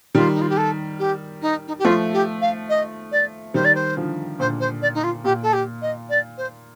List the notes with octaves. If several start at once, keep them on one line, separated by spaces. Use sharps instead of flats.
D#3 G3 F4
D#4
F4
G4
A4
G4
D#4
D#4
G4
F3 A3 F4
G4
F5
D#5
D5
D#3 G3 C5
D5
C5
D3 F3
A#2 D3 C5
C5
D5
D#4
F4
A#2 G4
A4
G4
D#5
D5
C5